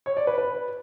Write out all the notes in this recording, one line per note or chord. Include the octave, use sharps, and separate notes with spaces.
C#5
D5
B4
B4